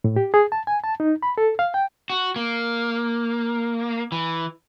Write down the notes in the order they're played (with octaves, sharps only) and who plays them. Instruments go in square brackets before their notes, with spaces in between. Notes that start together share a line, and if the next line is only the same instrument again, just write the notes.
[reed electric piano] A2
G4
G#4
A5
G#5
A5
D#4
B5
A4
F5
G5
[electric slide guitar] F#4
A#3
E3